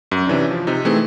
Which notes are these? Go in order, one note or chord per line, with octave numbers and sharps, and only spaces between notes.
F#2
C3 E3 C#4 D4
F3
C3 D#4
E3 A3 C4 G#4